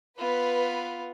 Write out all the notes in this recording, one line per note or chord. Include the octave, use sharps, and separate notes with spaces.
B3 F4 B4